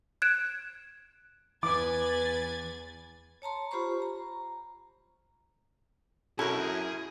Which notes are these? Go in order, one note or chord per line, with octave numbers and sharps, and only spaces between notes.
F#6 G#6 D7 E7
E2 E3 B4 G#5 D6 G#6 A6
C#5 A5 A#5 C6
F4 G4 C5 B5 C#6
A#5
F#2 B2 E4 A4 A#4 C#5 A5
G#4